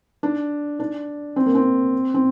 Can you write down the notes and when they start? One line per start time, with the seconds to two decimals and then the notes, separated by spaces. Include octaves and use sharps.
0.23 D4
0.79 D4
1.36 C4
1.46 A#3
1.55 C4
2.14 C4